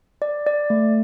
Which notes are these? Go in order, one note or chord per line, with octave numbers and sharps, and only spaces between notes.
D5
D5
A3